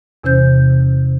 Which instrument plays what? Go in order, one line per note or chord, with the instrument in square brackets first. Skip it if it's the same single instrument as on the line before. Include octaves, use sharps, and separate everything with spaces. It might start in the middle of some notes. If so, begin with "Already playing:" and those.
[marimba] E2 C3 E3 C#4 C5 G6